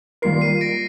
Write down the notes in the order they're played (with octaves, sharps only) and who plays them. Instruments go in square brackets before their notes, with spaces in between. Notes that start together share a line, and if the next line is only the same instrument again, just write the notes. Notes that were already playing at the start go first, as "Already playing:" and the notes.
[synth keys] D#3 G3 A#3 F4 A#4 [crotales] C7
[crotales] C7 D#7
A#6 D7